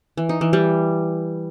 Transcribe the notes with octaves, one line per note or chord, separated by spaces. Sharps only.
E3
D#4
E3
G3